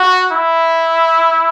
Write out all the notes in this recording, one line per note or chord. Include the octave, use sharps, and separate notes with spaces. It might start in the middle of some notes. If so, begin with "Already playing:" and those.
Already playing: F#4
E4